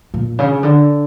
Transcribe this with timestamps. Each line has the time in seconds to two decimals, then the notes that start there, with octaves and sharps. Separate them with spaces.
0.14 A#2
0.39 C#3
0.63 D3